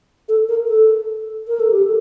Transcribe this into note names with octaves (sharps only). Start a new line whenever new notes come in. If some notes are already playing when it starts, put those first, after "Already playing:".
A4
A#4
A4
A#4
A4
G4
A4